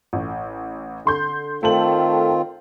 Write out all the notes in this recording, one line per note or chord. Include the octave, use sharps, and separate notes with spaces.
A1
D3 C6 G6
D#3 A3 C4 F4 A5 F#7